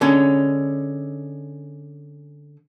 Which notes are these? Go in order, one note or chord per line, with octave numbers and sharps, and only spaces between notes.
D3 G#3 C#4